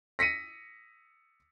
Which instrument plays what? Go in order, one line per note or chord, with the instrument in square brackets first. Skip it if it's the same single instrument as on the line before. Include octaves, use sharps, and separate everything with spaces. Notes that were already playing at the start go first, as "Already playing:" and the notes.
[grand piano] A#6 B6 C#7 D#7